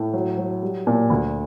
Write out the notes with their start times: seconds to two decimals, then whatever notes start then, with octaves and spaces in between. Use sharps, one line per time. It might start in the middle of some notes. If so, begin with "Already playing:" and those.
Already playing: A2
0.14 F#3
0.37 F#3
0.63 G3
0.87 A#2
1.10 D2